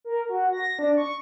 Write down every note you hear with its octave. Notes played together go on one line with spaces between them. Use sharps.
A#4
F#4
A#6
D4
C#6